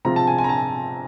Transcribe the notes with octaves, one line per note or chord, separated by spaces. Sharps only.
C3 F3 G#3 C4 F4 A#5
A5
G#5
G#5
A#5
A5